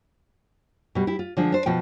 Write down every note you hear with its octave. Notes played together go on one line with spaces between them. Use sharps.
B2 G3
E4 G4
F4
D3 F3 G#3
D4 C5
B2 F3 G5